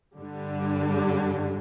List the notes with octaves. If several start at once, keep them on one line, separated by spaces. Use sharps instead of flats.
G2 D3 G3